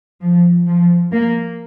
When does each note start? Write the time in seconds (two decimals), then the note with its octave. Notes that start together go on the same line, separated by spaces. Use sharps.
0.22 F3
0.67 F3
1.12 A#3